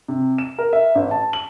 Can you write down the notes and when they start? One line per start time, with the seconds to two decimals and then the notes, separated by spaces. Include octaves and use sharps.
0.08 C3
0.38 E7
0.58 A#4
0.73 E5
0.95 A1
1.11 A5
1.33 F#7